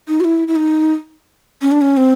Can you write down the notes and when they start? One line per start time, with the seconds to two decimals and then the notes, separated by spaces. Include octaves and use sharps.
0.08 D#4
0.20 F#4
0.24 E4
0.48 E4
0.56 D#4
1.62 C#4
1.72 D4
1.81 C#4
1.97 C4